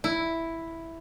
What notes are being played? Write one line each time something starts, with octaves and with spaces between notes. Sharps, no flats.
E4